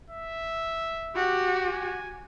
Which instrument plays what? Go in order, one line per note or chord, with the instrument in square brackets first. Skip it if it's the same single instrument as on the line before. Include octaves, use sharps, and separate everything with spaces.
[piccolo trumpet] E5
[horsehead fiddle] F#4 G4
[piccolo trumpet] G#5